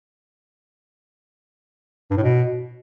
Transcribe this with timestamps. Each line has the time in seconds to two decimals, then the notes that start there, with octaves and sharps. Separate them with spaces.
2.11 G2
2.17 A2
2.23 B2